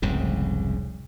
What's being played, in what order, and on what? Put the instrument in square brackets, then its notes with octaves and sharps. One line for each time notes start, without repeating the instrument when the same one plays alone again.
[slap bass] F1 C2 G#2 C#3